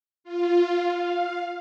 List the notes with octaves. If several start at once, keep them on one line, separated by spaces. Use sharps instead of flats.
F4
F5